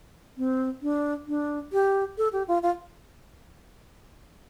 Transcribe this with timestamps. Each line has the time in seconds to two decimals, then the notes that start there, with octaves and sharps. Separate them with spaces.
0.38 C4
0.82 D4
1.27 D4
1.73 G4
2.18 A4
2.33 G4
2.48 F4
2.63 F4